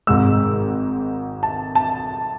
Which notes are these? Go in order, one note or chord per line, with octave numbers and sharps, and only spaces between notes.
G#1 G#2 G#3 E6
A5
A5